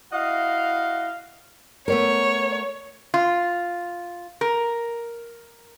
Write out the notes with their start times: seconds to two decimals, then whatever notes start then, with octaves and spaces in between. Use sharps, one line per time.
0.12 E4 F#4 D#5 F5
1.88 A3 B3 A#4 C#5
3.14 F4
4.41 A#4